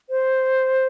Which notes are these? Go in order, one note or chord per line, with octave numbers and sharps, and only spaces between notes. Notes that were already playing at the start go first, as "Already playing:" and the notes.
C5